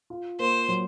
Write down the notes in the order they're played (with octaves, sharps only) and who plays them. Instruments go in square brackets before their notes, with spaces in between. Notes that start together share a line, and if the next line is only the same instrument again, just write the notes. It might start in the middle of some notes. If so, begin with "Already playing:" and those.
[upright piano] F4
[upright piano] A#3 [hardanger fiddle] C5
[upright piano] F#3